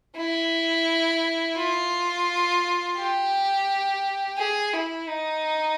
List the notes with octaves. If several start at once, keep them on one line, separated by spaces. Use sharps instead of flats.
E4
F4
G4
G#4
E4
D#4